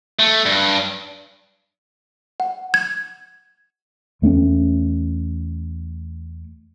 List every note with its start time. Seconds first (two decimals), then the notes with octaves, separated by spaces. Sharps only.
0.19 A3
0.46 G2
2.40 F#5
2.74 G#6
4.22 E2 A3 B3 C#4